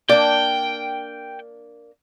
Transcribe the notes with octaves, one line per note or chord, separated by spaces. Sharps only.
A#3 D4 D5 G5